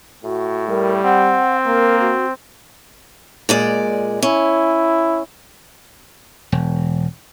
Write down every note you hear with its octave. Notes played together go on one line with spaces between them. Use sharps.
A2 F#4
G3 A#4
C4 F#5
A#3 A#4
F#4
A#2 G#3 D5
C#4 E4
E1